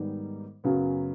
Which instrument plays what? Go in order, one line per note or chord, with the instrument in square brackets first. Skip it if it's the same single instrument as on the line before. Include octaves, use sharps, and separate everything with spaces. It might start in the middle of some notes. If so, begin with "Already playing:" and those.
Already playing: [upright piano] G#2 D#3 G3 B3 D#4
F#2 C#3 F#3 B3